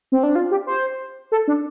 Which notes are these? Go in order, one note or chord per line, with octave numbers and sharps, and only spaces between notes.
C4
D4
F4
G4
C5
A4
D4